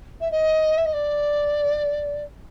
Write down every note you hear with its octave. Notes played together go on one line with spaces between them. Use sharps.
E5
D#5
E5
D#5
D5